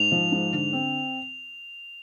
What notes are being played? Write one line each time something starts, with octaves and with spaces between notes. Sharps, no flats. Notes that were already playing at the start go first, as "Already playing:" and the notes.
Already playing: G#2 F7
F3
G#2
D3
C4